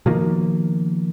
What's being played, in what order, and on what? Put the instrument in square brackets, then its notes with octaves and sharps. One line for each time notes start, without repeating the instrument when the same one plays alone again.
[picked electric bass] B2 D#3 F3 A#3